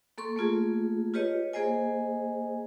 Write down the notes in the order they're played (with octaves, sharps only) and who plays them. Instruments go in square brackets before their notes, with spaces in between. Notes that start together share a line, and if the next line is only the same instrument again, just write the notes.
[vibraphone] A#3 A4 C6 C#6
A3 A#3 F4 G#4
F4 G4 B4 C#5 D#5
A#3 G#4 C5 D#5 G#5